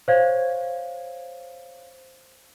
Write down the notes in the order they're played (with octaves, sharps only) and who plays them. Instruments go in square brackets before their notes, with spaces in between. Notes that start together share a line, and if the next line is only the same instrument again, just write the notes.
[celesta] C5 C#5 F5 G#6